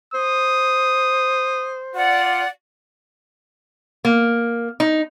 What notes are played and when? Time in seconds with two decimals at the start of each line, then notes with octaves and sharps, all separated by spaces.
0.14 C5 D#6
1.95 F4 D5 F#5
4.05 A#3
4.80 D#4